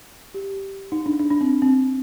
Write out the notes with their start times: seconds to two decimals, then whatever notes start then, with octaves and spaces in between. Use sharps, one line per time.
0.34 G4
0.92 D#4
1.06 D4
1.19 D4
1.30 D4
1.41 C4
1.62 C4